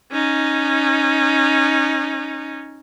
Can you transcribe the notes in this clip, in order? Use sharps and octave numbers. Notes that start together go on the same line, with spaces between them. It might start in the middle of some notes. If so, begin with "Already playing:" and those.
C#4 D#4